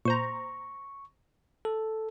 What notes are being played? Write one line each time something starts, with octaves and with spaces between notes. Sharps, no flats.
A#2 C5 A#5 C#6
A4